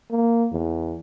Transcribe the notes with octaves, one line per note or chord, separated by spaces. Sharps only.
A#3
E2